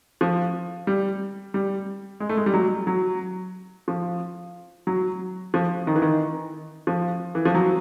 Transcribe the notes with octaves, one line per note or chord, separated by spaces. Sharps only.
F3
G3
G3
G#3
A3
G#3
G3
F#3
F#3
F3
F#3
F3
D#3
E3
D#3
F3
E3
F3
F#3